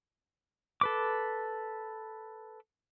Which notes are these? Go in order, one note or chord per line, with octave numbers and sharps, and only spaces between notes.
A4 B4 D6